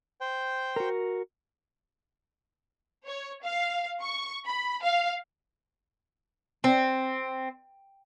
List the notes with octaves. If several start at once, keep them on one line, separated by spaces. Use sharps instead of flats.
C5 G5
F#4 A#4
C#5
F5
C#6
B5
F5
C4